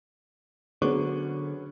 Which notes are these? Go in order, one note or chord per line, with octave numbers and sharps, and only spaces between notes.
D3 F#3 B3 C#4 G#4 C5 C#6